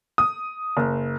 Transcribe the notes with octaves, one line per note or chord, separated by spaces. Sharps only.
D#6
F#1